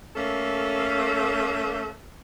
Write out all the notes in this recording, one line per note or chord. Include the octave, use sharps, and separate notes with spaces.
A3 A#3 C#4 A4